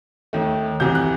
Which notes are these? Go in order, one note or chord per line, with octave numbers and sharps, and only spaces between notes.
D#2 D#3 A3
C2 C3 E3 G6
F#6